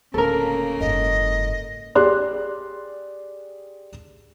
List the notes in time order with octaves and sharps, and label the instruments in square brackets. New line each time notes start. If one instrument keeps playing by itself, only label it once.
[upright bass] D1 [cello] C#3 A#3 [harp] A4 A#4
[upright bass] F#1 G#2 [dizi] D#5
[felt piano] G4 G#4 D5 C6 F#6